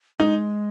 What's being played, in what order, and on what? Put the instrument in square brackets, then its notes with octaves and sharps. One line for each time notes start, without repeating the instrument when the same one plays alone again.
[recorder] G#3 [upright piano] D#4